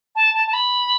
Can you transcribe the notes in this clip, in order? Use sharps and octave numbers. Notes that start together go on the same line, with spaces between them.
A5
A5
A5
B5